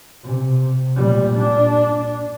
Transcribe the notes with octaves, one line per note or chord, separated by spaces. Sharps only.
C3
A#2 G3
D4